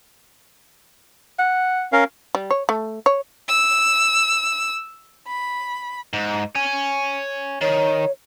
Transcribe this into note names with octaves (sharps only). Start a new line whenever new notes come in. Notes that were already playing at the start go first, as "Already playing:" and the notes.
F#5
C#4 A#4 F5
G3
C#5
A3
C#5
E6
B5
G#2
C#5 G#5
D#3 C#5